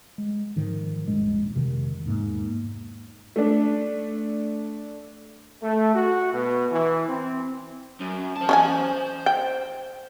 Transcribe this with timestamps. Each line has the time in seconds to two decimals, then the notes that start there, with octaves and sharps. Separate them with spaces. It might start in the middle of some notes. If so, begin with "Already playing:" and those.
0.18 G#3
0.56 G#2 D#3 F3
1.08 D#1 A#1 G#3
1.54 F2 C3 D#3
2.05 E2 G#2 A#3
3.36 A3 D4
5.62 A3
5.94 F#4
6.32 B2
6.71 E3
7.09 C4
8.00 F#2
8.37 C5 A5
8.49 C#4 D#5 G#5
9.26 G5